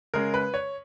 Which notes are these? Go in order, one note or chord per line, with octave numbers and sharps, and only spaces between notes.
C#3 G#3 C#4 A#4
B4
C#5